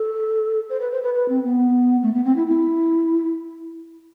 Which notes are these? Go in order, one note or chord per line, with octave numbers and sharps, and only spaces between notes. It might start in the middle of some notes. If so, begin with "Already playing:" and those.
Already playing: A4
C5
B4
C5
B4
B4
C4
B3
A3
B3
C4
E4
E4